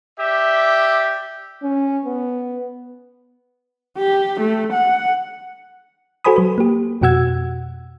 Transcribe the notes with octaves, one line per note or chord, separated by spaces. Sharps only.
G4 D5 E5
C#4
B3
G4
A3
F#5
F#4 A4 C5 G#5 B5 D#6
F#3 B4
A#3 G4
F2 B2 F#4 F#5 E6 G#6